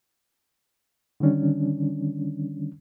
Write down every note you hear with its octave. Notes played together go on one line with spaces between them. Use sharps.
D3 D#3 G3 C#4 D4